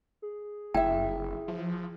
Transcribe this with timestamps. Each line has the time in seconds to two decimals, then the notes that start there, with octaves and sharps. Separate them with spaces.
0.22 G#4
0.74 F#1 E4 E5 G5
1.48 F3